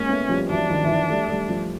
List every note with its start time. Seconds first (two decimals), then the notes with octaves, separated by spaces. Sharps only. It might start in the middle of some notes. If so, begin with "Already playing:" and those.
Already playing: G#3 A#3 C#4
0.09 A3 B3
0.29 F3 G3
0.49 E3 F#3 D4
0.69 D#3 F3
0.84 E3
0.89 D#3 F3
1.09 G3 A3
1.29 G3 A3
1.49 F3 G3